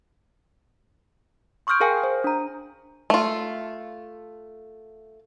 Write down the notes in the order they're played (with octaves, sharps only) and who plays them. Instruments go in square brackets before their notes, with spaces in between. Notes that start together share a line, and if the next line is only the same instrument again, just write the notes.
[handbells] C6 C#6 D#6 F6 G6 D7
G#4 A#4 F5 G5 G#5
C5
D4 A#5
[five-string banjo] A3 F4